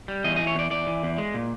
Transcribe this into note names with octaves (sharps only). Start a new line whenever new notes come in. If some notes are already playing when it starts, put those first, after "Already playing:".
G3
E2 D#5
E3 D#5
C#5
E2 D5
E2 D5
E3
E2
G#3
A#2